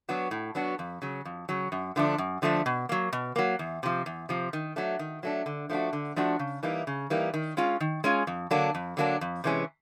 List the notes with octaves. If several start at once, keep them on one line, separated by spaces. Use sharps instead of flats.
F#3 B3 D4 F#4
A2
F#3 B3 D4 F#4
F2
C#3 F#3
F2
C#3 F#3
F#2
D3 F3 A3 D4
F#2
D3 F3 A3 D4
B2
F#3 A#3
B2
F#3 A#3
E2
C3 F3
E2
C3 F3
D#3
F#3 A3 D4
D#3
F#3 A3 D4
D3
F3 A3 D4 F#4
D3
F3 A3 D4 F#4
C#3
E3 G3 A#3 D#4
C#3
E3 G3 A#3 D#4
D#3
G#3 C#4 F4
D#3
G#3 C#4 F4
F2
D3 F#3 A#3 D4
F2
D3 F#3 A#3 D4
F2
C3 E3 G#3 C#4